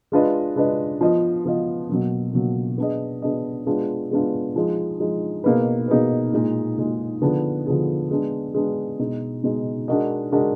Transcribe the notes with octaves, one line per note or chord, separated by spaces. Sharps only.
G#3 D4 F4 B4 D#5
G#3 D4 F4 B4 D#5
F3 B3 F4 B4 D#5
F3 B3 F4 B4 D#5
B2 F#3 A#3
B2 F#3 A#3
B3 D4 G#4 D#5
B3 D4 G#4 D#5
G#3 B3 D4 F4
G#3 B3 D4 F4
F3 G#3 D#4
F3 G#3 D#4
B2 A#3 D#4 G#4 B4
B2 A#3 D#4 G#4 B4
A#2 G#3 D#4 G#4
A#2 G#3 D#4 G#4
D3 F3 B3 D4 G#4
D3 F3 B3 D4 G#4
G#3 B3 D4
G#3 B3 D4
B2 G#3 D#4
B2 G#3 D#4
G#3 D4 F#4 A#4 D#5
G#3 D4 F#4 A#4 D#5